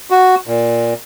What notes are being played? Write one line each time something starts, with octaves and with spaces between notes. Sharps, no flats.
F#4
A#2